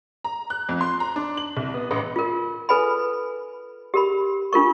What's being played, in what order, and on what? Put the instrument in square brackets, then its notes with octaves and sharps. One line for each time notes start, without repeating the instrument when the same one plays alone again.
[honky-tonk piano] A#5
F#6
F2
C6
A#5
D4
F#7
C2
B3
A1
[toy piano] F4 A#4
A4 B4 G#5 B5
G4 A#4 B5
D4 F4 A#4 C#6